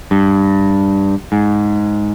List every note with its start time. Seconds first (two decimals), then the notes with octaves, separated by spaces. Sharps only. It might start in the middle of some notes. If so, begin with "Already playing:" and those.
0.11 G2
1.32 G#2